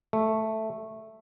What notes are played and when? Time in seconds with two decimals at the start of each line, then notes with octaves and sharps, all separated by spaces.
0.13 A3